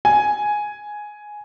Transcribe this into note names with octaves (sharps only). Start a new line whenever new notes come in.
G#5